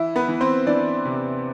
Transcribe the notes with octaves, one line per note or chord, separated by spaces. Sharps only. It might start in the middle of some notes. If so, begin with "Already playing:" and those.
Already playing: E3 E4 E5
B3 B4
E3
C4 C5
E3 D4 D5
C3